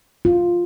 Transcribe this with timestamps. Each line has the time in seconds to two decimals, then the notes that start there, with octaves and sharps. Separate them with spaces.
0.25 F4